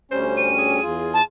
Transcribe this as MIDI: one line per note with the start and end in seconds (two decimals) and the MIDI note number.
0.11 0.80 38
0.11 0.80 55
0.11 0.80 61
0.11 0.52 72
0.37 0.83 99
0.58 1.22 68
0.83 1.20 40
0.83 1.20 65
1.13 1.22 81